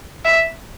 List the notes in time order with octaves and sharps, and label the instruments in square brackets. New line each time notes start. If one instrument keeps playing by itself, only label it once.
[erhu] E5